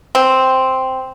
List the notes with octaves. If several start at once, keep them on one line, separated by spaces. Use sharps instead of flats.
C4